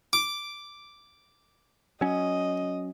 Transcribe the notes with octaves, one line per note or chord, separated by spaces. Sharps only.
D6
F#3 C#4 D#5